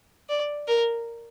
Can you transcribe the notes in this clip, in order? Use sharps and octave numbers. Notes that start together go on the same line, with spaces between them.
D5
A#4